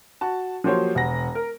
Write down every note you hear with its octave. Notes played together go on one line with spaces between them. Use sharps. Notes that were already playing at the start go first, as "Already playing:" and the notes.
F#4 A5
F3 F#3 A#3 G4 C5 C#5
E1 F#5 A#6
A#4